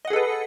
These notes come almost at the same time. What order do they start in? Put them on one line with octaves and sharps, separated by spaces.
D#5 F#5 G#4 A4 B4